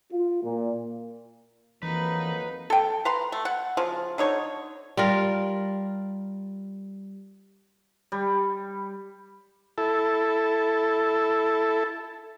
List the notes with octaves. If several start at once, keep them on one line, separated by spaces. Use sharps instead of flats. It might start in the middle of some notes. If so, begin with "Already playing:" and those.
F4
A#2
F2 E3 F#3 A#3 D#4 B4
A4 G5
B4 A#5 C6
A3
F#5
C#3 F3 F#3
D3 D#4 C#5
G3 F4 A#4
G3
E4 A4